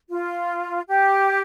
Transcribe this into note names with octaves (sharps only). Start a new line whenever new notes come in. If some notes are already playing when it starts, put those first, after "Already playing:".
F4
G4